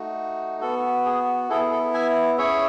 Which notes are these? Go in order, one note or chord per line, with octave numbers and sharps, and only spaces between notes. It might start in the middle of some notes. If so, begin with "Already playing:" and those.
Already playing: A3 D#4 F#4
B3 F#4 A4
G#4
B3 E4 G#4 A4
G#4
A4
E5 G#5
C#4 E4 G#4 C#5 E5